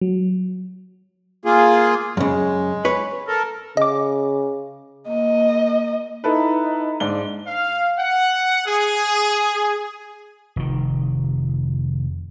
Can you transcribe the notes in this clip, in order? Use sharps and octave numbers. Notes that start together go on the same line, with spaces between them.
F#3
A#3 F4 G#4
F#2 C#3 G#3
B4 C#5
A4 A#4
C#3 D#5 D6
A#3 D#5
D#4 E4 A4 B4
G#2 D4 G7
F5
F#5
G#4
F1 D#3